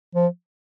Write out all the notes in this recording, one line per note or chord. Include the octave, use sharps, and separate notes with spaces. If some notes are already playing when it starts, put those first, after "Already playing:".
F3